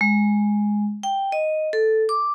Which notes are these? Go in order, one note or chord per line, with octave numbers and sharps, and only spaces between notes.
G#3
G5
D#5
A4
D6